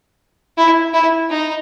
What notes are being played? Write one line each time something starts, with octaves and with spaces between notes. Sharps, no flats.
E4
E4
D#4